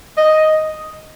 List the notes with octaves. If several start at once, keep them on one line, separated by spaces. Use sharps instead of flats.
D#5